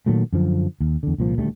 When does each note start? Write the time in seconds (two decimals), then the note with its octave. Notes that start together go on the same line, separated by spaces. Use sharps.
0.06 A#2 D#3 F#3 A3
0.33 F#2 D3 F3
0.80 D#2
1.03 E2 D3
1.18 C2 A#2 F3
1.38 D#1 D2 G3 A3